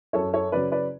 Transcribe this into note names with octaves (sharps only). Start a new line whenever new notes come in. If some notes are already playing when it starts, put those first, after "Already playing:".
F#2 A4 C#5
A4 C#5
C#3 F#3 C#4 B4 D5
B4 D5